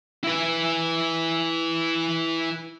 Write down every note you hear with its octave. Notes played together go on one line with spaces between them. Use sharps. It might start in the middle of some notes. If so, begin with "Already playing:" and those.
E4 B4